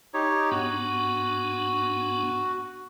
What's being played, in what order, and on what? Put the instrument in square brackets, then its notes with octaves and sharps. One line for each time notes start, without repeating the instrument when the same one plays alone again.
[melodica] D#4 G4 C#5
[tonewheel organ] G#2 B3 D4 [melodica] F#4